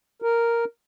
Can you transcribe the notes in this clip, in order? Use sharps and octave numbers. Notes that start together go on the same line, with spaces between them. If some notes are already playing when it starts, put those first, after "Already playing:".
A#4